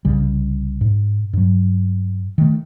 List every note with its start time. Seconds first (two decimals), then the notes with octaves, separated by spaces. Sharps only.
0.05 C2 C#3 G3
0.81 G#2
1.33 G2 F#3
2.38 D#3 A3